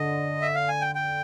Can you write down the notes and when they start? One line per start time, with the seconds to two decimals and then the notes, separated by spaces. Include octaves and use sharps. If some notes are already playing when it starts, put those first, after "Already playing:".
Already playing: D3 D#5
0.42 E5
0.55 F5
0.69 G#5
0.81 G5
0.95 G5